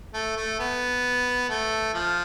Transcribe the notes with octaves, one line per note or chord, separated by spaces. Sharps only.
A3
A3
B3
A3
F3